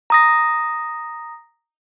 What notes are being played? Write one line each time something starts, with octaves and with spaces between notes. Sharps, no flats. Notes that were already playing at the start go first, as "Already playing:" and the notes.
A#5 D#6 A#6